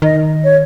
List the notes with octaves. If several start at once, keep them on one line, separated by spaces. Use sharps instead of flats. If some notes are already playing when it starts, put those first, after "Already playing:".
D#3 D#5
C#5